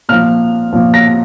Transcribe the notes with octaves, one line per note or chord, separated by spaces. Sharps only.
A#2 F3 F6
A#2 F3
A#6